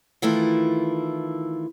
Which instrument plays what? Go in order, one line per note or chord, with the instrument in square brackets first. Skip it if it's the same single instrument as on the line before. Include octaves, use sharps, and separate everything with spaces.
[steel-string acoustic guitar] D#3 E3 A3 E4 F4